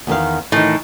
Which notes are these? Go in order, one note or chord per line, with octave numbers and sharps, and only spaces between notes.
E2 D#3 F5
A2 D#3 E3